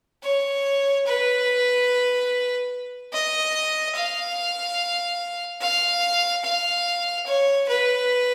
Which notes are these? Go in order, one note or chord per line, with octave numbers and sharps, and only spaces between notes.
C#5
B4
D#5
F5
F5
F5
C#5
B4